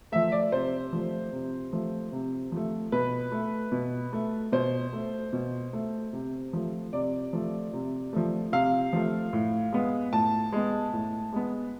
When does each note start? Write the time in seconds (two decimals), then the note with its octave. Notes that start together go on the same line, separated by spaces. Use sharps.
0.12 F3 A3 E5
0.32 D5
0.52 C3 C5
0.93 F3 A3
1.32 C3
1.72 F3 A3
2.12 C3
2.52 F3 A3
2.92 B2 B4
3.32 A3
3.72 B2
4.13 A3
4.52 B2 C5
4.93 A3
5.33 B2
5.73 A3
6.13 C3
6.53 F3 A3
6.93 C3 D5
7.33 F3 A3
7.73 C3
8.13 F3 A3
8.52 C3 F5
8.93 F3 A3
9.33 A2
9.72 G#3 B3
10.13 A2 A5
10.52 G#3 B3
10.93 A2
11.33 G#3 B3